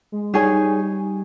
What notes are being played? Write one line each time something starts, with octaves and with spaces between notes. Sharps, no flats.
G#3
G3 D#4 G#4 C#5 G#5